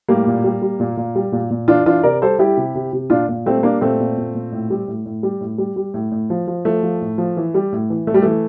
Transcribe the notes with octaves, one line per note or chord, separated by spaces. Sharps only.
A2 G3 A#3
A#2
G3
G3
A#2
A#2
G3
A#2
A#2
E3 D4 F4
E3 D4 F4
C3 A#4 D5
G3 A4 C5
G3 E4 G4
C3
C3
C3
A#2 D4 F4
A#2
G3 A3 C4
G3 A#3 D4
A#2 A3 C4
A#2
A#2
A#2
A2
G3
A2
A2
G3
A2
G3
G3
A2
A2
F3
F3
F3 A3
F3
A2
F3
E3
G3
A2
E3
A2 A3
G3
E3 A3